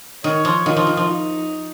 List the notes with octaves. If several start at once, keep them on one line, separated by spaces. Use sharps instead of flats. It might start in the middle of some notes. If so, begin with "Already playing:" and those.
D#3 C#5
F3
D#3 F4
F3
D#3
F3
D#4